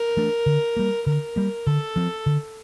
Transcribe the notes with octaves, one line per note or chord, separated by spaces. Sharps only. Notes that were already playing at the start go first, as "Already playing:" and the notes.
Already playing: A#4
E3 A3 D4
D3
G3 A#3
D3 A#4
G3 A#3
D3 A4
F3 C4
D3